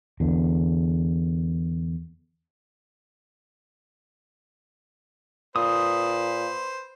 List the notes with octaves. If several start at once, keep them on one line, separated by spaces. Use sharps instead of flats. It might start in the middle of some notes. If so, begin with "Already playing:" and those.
E2 D3
A#2 B4 C5 D#6